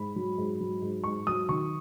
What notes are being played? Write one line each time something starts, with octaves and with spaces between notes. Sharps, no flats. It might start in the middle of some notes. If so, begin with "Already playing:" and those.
Already playing: G#2 B5
F#3
G#2
F#3
G#2
G#2 C#6
F#3 D#6
D#3 C#6